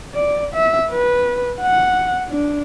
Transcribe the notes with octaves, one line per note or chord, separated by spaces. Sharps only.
D5
E5
B4
F#5
D4